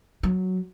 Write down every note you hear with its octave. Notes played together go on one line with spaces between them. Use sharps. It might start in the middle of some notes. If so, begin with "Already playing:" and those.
F#3